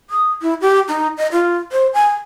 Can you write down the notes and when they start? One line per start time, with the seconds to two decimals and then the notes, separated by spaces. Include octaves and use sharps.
0.10 D#6
0.42 E4
0.61 G4
0.89 D#4
1.17 D#5
1.32 F4
1.72 C5
1.94 G#5